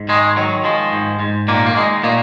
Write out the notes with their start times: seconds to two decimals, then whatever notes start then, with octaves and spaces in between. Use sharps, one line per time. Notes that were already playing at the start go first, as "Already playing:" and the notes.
Already playing: G#2
0.09 D#3 G#3
0.37 D#3 F#3
0.64 F3 G#3
0.92 G#2
1.20 G#2
1.48 A#2 D#3 A#3
1.67 A#3
1.76 D#3 G#3
2.03 A#2 D#3 A#3